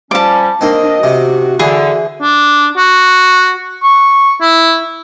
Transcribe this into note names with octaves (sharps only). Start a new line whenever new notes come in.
F3 G3 C#4 A5 D6
A#3 C4 D4 D#5
C3 F#4
D3 E3 G#4
D4
F#4
C#6
E4